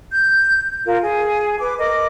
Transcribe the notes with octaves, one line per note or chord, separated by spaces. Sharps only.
G6
F4 A#4
G#4
B4 D6
A#4 D#5 D6